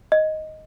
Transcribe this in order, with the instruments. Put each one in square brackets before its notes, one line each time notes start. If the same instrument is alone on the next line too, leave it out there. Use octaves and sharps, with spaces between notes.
[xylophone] D#5